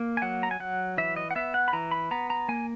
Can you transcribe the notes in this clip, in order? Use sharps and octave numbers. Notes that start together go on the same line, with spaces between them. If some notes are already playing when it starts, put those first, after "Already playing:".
Already playing: A#3
G#5
F#3 F#5
A#5
G#5
F#3 F#5
E3 E5
D#5
F#5
B3 E5
F#5
B5
E3 A#5
B5
B3 A#5
A#5
A#3 G#5